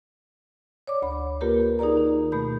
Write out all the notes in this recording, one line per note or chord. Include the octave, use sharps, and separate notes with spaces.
C#5 D5 D6
D2 B5
A#3 F4 G4 A#4 B4
D#4 G#4 A#4 D5 A#5
D#3 D#4
B2 A3 B5 G6